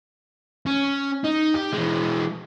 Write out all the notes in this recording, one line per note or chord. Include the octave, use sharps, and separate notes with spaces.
C#4
D#4
G4
E3 G#3